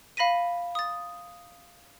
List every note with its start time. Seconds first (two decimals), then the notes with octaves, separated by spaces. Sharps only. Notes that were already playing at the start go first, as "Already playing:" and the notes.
0.17 F5 B5 A#6 B6 D#7
0.75 D#6 A6